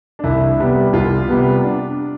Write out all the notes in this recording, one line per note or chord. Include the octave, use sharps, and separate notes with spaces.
D4
C2 E4
C3 G3 B3
C2 F4
C3 G3 B3
D4